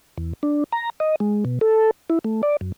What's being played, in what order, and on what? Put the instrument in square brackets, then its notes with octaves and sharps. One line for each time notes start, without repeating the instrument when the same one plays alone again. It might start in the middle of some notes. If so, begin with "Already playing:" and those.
[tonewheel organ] E2
D4
A#5
D#5
G#3
B2
A4
E4
A3
D5
F#2